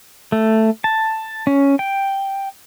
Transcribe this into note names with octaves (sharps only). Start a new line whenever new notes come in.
A3
A5
C#4
G5